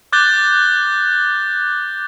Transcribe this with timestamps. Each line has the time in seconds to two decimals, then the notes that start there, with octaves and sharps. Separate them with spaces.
0.12 D6 F#6 G6 A6 G7